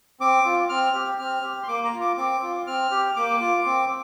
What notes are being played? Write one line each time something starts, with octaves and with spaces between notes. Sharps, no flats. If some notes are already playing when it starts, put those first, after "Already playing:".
C4 D6
F4
C4 F6
G4
C4 F6
G4
C6
A#3 D6
A#5
F4
D6
C4 D6
F4
C4 F6
G4
A#3 D6
F4
C4